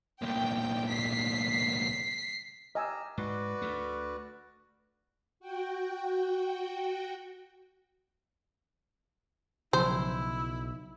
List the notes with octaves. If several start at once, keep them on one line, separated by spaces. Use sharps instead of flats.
C2 A#2 G5
B6 C7
G4 D#5 G#5 A#5 E6 F6
G#2 F#4 B4 D5
D2 A3
F#4 G5
B1 C#3 F3 F#3 E4 C5